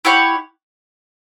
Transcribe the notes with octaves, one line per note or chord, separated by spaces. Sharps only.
E4 G4 C#5 F#5